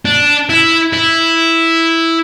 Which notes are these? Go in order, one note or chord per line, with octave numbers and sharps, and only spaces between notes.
D4
E4
E4